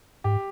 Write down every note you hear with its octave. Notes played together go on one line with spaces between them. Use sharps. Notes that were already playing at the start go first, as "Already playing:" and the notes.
G#2 G4